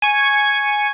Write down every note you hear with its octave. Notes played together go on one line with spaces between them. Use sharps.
G#5 C#6